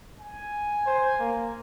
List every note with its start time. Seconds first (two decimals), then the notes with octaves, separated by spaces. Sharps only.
0.19 G#5
0.86 C5
1.20 A#3